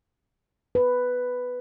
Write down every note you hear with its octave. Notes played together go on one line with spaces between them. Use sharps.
B4